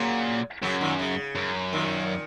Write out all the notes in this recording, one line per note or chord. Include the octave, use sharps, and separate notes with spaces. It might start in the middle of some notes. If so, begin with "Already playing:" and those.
Already playing: A#2 C#3 F#3
F#2 C#3 F#3
A#2 D#3
C#3
F#2
A#2 D#3